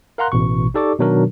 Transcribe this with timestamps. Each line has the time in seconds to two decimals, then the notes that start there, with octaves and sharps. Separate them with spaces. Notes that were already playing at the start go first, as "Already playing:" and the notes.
0.18 A#4 F5 F#5 A#5 C6 F#6
0.32 A1 B2 C#6
0.74 D#4 G4 A4 D5 C#6 D6
0.99 B2 D#3 F#3 D4 F#4 A#4